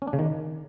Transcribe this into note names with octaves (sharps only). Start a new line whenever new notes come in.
C#4
D4
C#3
D#3